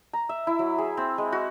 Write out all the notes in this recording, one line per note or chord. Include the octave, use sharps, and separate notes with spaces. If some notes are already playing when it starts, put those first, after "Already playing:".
A#5
E5
E4
F#3
G#4
C4
G#3
F#4